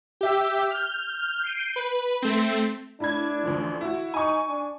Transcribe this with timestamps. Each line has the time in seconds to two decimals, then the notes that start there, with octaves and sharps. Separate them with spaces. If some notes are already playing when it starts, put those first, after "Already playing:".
0.21 G4 E5 G5
0.71 F6 G6
1.42 G6 C7 D7 D#7
1.76 B4
2.22 A3 C4
3.00 A2 D4 B5 G#6
3.43 A1 D2 F3
3.81 E4 F#4
4.14 D#4 G#5 C#6
4.48 D4